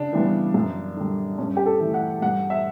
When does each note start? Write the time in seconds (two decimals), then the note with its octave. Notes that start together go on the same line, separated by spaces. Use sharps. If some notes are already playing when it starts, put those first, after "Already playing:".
Already playing: C#3 D4
0.13 E3 G3 B3
0.54 F#2
0.97 D3 G3
1.38 G2 C#4
1.57 G4
1.66 A4
1.80 E3 A3
1.94 F#5
2.22 G2 F#5
2.50 E5